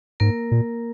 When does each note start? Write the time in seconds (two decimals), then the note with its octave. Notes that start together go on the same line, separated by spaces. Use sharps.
0.20 G#2 A#3 A#4
0.51 A#2